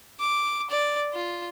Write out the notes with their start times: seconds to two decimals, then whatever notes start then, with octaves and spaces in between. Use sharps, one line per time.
0.20 D6
0.70 D5
1.14 F4